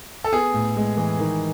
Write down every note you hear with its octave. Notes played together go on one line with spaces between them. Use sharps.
A4
B3 G#4
A2
G#3
E3
D#3